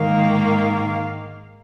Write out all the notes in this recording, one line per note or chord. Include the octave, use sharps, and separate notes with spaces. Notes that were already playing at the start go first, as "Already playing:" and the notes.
Already playing: G#2 D#3 A#3 F5